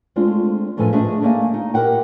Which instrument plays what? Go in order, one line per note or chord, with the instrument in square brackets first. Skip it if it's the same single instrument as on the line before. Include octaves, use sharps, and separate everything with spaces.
[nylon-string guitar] G#3 A3 C4 D4 F4
F#2 A2 F3 A4 B4 G#5
A3 D4 G#4 C#5 D#5 E5
A3 A#3 D5 F5 G#5
D#4
G4 A#4 D#5 F#5 G5